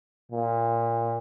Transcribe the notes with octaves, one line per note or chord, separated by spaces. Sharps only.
A#2